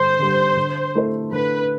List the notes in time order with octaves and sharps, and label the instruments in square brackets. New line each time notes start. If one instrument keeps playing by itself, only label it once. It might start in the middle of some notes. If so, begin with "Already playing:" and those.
Already playing: [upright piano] G2 D3 [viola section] C5
[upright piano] D3 G3
D3
A3 E4 A4 C5
[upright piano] D3 [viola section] B4